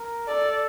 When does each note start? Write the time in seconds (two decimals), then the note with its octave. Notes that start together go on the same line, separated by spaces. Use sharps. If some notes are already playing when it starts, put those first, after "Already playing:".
Already playing: A#4
0.28 A4 D5